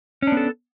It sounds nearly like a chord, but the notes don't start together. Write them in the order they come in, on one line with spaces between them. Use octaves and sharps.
C#4 D4 B3 A4